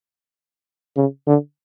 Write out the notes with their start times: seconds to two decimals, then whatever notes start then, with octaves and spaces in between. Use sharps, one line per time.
0.97 C#3
1.27 D3